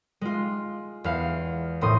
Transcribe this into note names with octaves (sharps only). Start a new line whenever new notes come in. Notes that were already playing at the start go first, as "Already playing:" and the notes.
G#3 F4
E2 F5
A#1 A2 C6 D#6